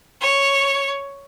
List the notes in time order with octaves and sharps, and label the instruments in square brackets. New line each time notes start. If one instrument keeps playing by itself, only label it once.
[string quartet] C#5